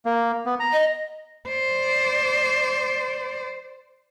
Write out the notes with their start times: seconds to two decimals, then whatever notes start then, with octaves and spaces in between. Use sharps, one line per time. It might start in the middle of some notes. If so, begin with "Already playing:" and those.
0.05 A#3
0.46 B3
0.60 A#5
0.73 D#5
1.49 C5 D5